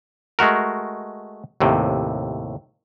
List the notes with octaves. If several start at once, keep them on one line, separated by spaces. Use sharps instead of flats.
G#3 A3 F#4 A#4
D#2 A2 C3